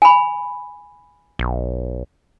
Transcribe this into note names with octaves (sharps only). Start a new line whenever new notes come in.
G#5 B5
B1